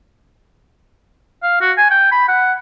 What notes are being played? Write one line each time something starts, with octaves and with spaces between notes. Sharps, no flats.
F5
F#4
G#5
G5
B5
F#5